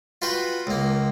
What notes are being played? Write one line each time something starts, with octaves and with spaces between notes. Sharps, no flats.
F4 F#4 B4 G5
C#2 A#3